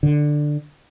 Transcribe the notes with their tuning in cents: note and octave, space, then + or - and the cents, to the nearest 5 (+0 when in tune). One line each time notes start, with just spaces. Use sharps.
D3 +10